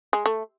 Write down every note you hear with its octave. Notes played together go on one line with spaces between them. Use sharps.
G#3
A3